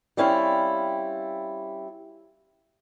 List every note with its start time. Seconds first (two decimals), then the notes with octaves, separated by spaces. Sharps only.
0.17 G3 C4 C#4 E4 F5